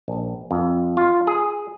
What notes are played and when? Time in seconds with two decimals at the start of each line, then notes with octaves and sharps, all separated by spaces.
0.08 A#1
0.51 F2
0.97 F4
1.27 G#4